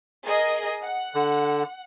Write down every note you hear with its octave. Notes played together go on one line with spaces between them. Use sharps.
G#4 A#4 D#5
F#5
D3